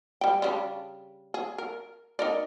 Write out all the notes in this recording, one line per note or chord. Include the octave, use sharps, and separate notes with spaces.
G3 G5
C#3 G3 D4
G#4
A#4
D#4 A#4 D5